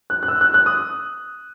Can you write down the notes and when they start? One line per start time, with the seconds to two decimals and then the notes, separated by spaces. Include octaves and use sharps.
0.10 F#6
0.23 F#6
0.28 E6
0.41 F#6
0.54 F#6
0.66 D#6